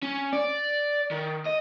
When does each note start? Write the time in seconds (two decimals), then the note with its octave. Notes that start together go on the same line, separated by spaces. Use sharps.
0.03 C#4
0.33 D5
1.11 D#3
1.46 D#5